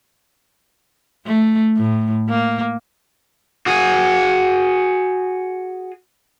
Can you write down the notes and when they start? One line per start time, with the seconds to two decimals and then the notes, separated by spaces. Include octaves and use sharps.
1.26 A3
1.77 A2
2.29 A#3
3.66 F#4 G#4